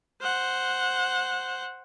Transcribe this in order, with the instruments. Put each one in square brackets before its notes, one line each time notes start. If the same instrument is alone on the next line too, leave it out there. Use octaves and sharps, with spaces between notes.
[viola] C5 F#5